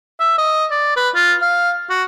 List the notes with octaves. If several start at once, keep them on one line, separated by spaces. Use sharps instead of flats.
E5
D#5
D5
B4
F4
F5
F#4